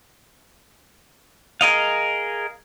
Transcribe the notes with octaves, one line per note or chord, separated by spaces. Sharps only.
G#4 A#4 D#5 F5